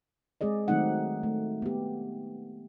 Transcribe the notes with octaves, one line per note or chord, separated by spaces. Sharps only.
G#3 C4 G#4 D5 D#5
D#3 F#3 A3 C4 D#4 F#5
A3
B3 G4